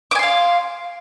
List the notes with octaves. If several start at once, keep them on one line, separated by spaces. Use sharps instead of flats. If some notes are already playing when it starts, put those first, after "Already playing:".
F5 G#5 C6 D6